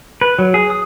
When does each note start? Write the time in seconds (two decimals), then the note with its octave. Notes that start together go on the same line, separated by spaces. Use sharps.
0.21 B4
0.39 F#3
0.54 G#4
0.70 D#6